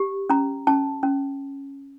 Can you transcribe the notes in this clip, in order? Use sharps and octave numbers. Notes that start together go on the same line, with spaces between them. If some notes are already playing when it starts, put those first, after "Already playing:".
Already playing: G4
C#4 A#5
C#4 A5
C#4